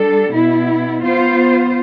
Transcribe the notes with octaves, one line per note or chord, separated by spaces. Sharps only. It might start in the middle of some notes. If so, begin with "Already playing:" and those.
Already playing: G3 D4 A4
B2 B3 E4
B3 F4 C5